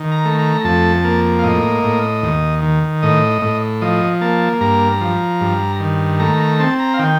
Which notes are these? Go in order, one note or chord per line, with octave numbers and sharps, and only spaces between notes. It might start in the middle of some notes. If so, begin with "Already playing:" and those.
Already playing: D#3
A#5
A3
A#5
F2 A5
A#3
F5
A2 D#5
A2
D#2
D#3
A2 D#5
A2
F3 D#5
A#3 A5
G2 A#5
F3
G2
D#3
A3 A#5
A#5
C4 A5
A#5
F5
D#3 G5